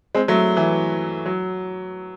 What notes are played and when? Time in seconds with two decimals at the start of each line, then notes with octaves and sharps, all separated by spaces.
0.15 G#3 C4
0.28 F#3 A3
0.57 E3
1.26 F#3